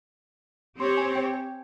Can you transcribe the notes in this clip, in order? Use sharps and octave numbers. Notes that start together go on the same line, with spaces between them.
C4 G4 C#5 C6
G#5
G5
G#5